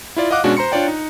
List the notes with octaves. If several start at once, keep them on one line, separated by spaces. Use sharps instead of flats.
E4 F4 D5
D#5 F5 F#5 D6 F#6
B2 G#3 C#4 D4 F#4
C5 A#5 C6 C#7
D4 F4 C#5 D5 G5
D#4